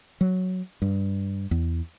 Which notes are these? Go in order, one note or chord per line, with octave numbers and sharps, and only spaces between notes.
F#3
G2
E2